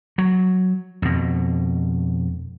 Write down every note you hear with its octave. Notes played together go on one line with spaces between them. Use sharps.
F#3
F2 B2